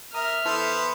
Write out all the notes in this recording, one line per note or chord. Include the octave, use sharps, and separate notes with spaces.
A#4 E5 D#6 F6
E3 B3 A4 C5 B6